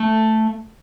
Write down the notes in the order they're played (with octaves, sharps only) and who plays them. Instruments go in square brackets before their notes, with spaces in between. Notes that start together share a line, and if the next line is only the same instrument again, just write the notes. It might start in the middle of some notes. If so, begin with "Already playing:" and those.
Already playing: [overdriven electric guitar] A3